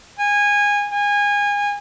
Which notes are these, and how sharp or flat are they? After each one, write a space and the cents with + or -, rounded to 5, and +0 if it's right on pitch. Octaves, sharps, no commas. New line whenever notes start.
G#5 -20
G#5 -25